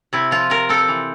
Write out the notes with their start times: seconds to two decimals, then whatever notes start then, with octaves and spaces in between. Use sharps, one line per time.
0.13 C3 E4
0.31 F3 F4
0.50 C3 A#4
0.69 C4 A4
0.88 E3